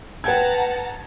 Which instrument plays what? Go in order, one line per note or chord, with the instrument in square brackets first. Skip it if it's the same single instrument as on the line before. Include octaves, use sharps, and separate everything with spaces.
[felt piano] B4 G5 G#6 [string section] F#5 A5 A#5